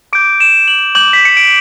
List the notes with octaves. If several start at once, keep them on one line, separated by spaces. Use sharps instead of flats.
D6 G6 D7
E7
F#7
D6 G6 F#7
B6
C#7
D7